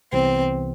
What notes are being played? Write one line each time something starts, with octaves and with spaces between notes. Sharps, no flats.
C2 C3 E3 B3 C4